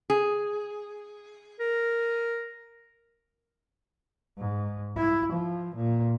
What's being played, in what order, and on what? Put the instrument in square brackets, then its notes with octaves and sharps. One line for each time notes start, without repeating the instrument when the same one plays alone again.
[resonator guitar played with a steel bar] G#4
[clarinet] A#4
[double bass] G#2
E4
F3
A#2